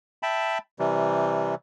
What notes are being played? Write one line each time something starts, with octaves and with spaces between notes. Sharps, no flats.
E5 G5 A5 B5
C3 E3 G3